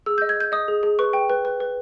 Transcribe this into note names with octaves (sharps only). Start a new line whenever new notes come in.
G#4 E6
G6
D#5
G#6
D#5 G6
D#5 D#6
G#4
G#4
B4 C#6
G5
B4
B4
B4